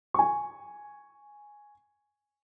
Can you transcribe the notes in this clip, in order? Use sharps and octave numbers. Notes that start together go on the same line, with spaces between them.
G#5 C#6